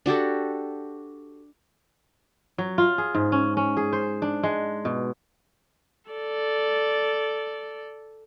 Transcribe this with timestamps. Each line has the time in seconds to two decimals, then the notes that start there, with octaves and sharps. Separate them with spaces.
0.06 D4 F#4 G4 A4
2.58 F#3
2.78 F4
2.98 G#4
3.15 G#2
3.32 C#4
3.57 C#4
3.77 G#4
3.93 C5
4.22 D4
4.43 G#3
4.85 B2
6.10 A4 D5